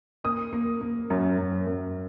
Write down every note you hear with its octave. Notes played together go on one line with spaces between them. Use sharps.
A#3 D#6
A#3
A#3
F#2
F#2
F#2